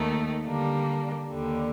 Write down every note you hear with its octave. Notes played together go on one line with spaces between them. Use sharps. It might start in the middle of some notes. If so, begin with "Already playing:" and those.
Already playing: D#2 D#3 A3 D#4
D3 G3 A#3 D4
D#2 D3 G3